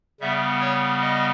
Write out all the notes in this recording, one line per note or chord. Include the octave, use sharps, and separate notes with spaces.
C#3 G3 B3 E5
C#5
D#5